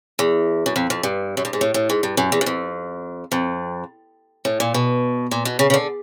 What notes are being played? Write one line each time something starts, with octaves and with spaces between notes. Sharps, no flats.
E2
F#2
F2
F2
G2
F#2
G2
G#2
A2
A2
G#2
G2
F#2
E2
F#2
F2
F2
A2
A#2
B2
A#2
B2
C#3
C#3
D3